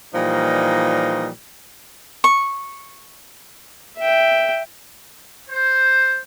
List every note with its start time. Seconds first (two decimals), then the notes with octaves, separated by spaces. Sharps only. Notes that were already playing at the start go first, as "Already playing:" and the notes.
0.14 A#2 E3 F3 G3 D#4
2.24 C#6
3.97 E5 G5
5.49 C5